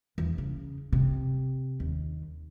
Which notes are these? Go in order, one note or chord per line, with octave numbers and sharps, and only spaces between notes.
E2
C#3
C3
D#2